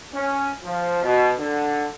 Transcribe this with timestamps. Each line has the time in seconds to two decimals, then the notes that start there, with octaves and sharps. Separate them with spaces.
0.14 C#4
0.63 F3
1.02 B2
1.38 D3